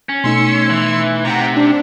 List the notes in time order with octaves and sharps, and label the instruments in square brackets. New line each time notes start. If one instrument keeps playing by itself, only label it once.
[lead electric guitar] C#4
[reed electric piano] B2 A3 D#4 [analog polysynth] C6 E6 C#7
[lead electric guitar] E3
[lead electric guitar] C3 [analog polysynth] F#5 G5 A#5
[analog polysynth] D4